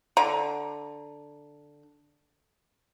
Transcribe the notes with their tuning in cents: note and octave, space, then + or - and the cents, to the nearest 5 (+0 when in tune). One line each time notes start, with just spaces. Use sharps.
D3 +0 A#5 +20